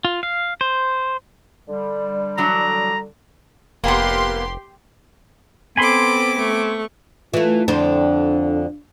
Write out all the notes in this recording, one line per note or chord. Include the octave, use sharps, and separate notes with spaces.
F4
F5
C5
D3 G3
E3 F#3 D4 A#5
F1 A#3 B3 G4 C6
B3 C4 A4 G#5 B5 C6 D6
A3 C#6
E3 A3 F4
F2 D3 D4 C5